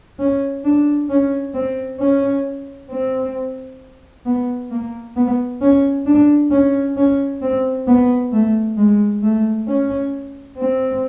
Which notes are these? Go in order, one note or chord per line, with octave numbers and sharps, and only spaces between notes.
C#4
D4
C#4
C4
C#4
C4
B3
A#3
B3
C#4
D4
C#4
C#4
C4
B3
A3
G#3
A3
C#4
C4